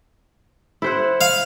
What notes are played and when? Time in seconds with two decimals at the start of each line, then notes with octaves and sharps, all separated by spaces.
0.82 E4 C5 F#5
1.21 F5